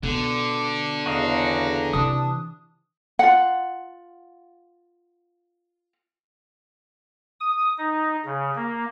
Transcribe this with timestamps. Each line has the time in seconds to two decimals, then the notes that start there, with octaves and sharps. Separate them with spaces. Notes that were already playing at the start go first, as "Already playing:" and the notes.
0.03 B2 D3
0.60 D6
1.06 E2 C#3 F#4 D#5 F5 A#5
1.93 C3 E3 D4 D#6
3.19 F4 F#5
7.40 D#6
7.78 D#4
8.25 C#3
8.55 A#3